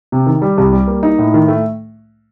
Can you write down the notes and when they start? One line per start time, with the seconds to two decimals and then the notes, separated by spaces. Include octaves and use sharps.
0.12 C3
0.27 D#3
0.42 G3
0.58 C2
0.72 G3
0.88 A#3
1.03 D#4
1.18 A2
1.34 D#3
1.48 A3